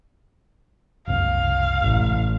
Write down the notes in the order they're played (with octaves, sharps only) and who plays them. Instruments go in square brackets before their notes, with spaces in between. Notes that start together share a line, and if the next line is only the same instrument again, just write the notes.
[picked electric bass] F#1 C2 [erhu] F5
[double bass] A1